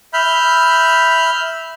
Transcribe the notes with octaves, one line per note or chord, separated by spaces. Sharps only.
E5 B5 F6 G6